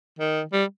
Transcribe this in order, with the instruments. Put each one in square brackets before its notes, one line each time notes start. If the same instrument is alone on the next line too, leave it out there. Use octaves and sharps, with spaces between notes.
[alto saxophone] D#3
G3